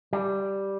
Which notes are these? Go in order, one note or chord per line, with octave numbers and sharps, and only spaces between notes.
G3